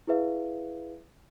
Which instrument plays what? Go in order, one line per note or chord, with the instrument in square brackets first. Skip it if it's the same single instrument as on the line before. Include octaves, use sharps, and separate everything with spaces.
[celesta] E4 G#4 B4 E5 F5